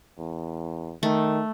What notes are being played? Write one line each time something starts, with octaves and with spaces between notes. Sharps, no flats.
E2
D#3 A3